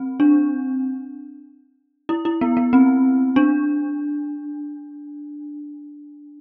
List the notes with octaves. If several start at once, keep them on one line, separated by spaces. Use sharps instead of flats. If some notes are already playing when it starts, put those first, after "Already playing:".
Already playing: C4
D4
E4
E4
B3
B3
C4
D4